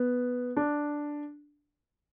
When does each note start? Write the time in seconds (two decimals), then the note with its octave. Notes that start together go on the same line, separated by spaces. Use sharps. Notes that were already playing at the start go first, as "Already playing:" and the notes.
Already playing: B3
0.57 D4